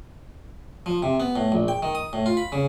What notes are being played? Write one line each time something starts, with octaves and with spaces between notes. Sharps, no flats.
F3
C3
B3
A2
A#1
G5
D#3
D#6
A2
F4
B5
C#3